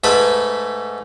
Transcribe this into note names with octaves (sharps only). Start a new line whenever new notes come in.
G#2 A3 B4 B5